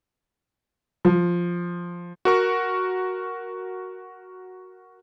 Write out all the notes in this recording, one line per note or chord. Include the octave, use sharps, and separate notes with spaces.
F3
F#4 A#4 C#6